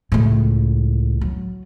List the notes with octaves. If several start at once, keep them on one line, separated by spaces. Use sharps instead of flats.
C#2 A2
F#3